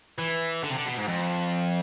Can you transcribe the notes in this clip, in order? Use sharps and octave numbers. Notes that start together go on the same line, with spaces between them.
E3
D3
C3
D3
B2
G#2
F2